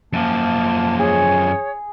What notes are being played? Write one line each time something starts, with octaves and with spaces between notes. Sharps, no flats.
F#2 F3 A#3 A5
G#4 C#5